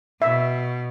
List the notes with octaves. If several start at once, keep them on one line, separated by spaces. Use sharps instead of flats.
B2 E5